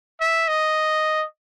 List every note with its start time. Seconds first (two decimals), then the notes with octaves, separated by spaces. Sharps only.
0.21 E5
0.48 D#5